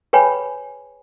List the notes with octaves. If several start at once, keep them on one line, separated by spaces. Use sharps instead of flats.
G#4 B4 C#5 G5 G#5 B5